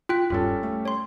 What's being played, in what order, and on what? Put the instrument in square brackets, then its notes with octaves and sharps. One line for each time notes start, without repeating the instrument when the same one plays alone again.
[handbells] F4 G5 F#6 [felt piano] B6
[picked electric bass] D#1 G2 [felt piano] G3 C#4 A4 [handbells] F4
[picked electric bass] A3
[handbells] C#5 C6